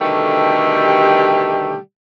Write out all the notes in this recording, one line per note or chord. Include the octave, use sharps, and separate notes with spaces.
B2 D3 D#3 G3 A3 G4